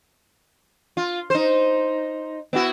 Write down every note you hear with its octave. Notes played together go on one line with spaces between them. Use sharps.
F4
D#4 C5
B3 E4 F#4